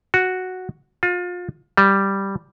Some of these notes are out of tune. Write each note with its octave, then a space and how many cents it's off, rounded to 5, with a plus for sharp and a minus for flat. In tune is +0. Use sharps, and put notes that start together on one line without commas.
F#4 -5
F4 +30
G3 +0